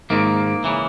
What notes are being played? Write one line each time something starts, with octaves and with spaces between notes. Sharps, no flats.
G#2 D#3 A#3
C#3 E3